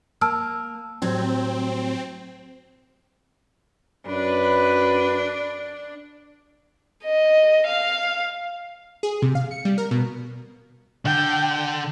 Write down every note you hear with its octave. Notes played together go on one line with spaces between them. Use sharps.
A#3 A5 E6 F6
A2 F#3 G3 C4
F#2 D4 B4
D#5
F5
G#4
C3
F5
C#7
G3
A#4
B2
D3 G5